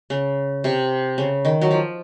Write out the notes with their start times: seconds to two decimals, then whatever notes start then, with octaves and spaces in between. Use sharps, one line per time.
0.10 C#3
0.64 C3
1.18 C#3
1.45 D#3
1.61 F#3
1.71 F3